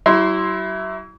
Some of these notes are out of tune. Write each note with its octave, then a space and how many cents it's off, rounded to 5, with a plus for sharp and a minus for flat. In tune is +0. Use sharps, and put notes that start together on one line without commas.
F#3 +40 E4 +0 C6 +0